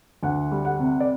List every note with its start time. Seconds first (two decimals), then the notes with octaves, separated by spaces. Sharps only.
0.23 D2 F#5
0.51 G3
0.65 F#5
0.79 C3
1.00 D5